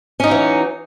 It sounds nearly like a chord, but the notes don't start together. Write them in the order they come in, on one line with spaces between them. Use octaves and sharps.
C#4 D#4 F#3 E3